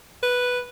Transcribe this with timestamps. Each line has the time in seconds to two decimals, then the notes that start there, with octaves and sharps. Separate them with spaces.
0.23 B4